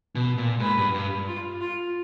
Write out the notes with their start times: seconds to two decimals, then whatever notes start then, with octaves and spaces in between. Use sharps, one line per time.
0.15 B2
0.38 A#2
0.60 G#2 B4
0.77 G2
0.94 G2
1.27 F4
1.61 F4